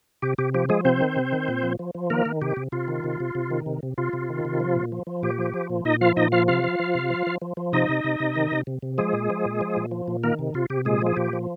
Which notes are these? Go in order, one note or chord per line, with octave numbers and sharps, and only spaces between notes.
C3 G4
C3 G4
F3 G4
F3 G#3 G#4
C3 C4 C5
D#3
C3
D#3
A#2
F3
F3
F3
D#3 A#3 A#4
D#3
C3 G4
C3
C3 F4
D#3
C3
C3
C3
D#3
C3
C3
C3 F4
C3
D#3
C3
F3
A#2
F3
F3
A#2 G4
F3
F3
A#2
A#2 D#4 D#5
F3 F4 F5
A#2 D#4 D#5
F3 F4 F5
C3 F4 F5
F3
F3
C3
F3
F3
F3
F3
C3 D#4 D#5
C3
C3
C3
D#3
C3
C3
C3
F3 G#3 G#4
A#2
F3
A#2
F3
A#2
F3
A#2
D#3 A#3 A#4
C3
C3 F4
C3 G4
A#2 G#3 G#4
F3 G#4
A#2 G4
F3